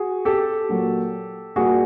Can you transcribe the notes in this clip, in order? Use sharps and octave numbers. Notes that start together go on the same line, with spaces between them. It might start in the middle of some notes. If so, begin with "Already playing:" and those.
Already playing: F#4 G#4
G4 A4
A#2 F#3
A#2 G3 F#4 G#4